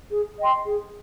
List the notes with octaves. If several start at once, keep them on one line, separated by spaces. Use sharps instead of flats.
G#4
D#5 G5 C6
G#4